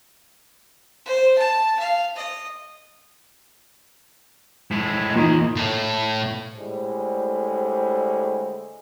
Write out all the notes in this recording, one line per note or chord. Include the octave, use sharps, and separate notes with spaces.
C5
A5
F5
D#5
A2 G#3
E2 A#2 D#4
A2
A2 D3 G3 G#3 C5